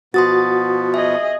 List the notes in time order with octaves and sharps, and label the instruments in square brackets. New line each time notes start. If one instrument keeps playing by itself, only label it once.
[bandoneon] B2 F3 B3 [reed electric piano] F#4 [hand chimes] C6 D#6 A6
[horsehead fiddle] G#4 D#5 [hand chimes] E5